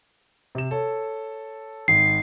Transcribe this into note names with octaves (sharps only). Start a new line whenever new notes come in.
C3 E7
A4 C#5
G#1 C7